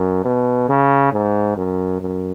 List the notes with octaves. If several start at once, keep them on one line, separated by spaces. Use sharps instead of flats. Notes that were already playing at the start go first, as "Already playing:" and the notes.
Already playing: F#2
B2
C#3
G#2
F#2
F#2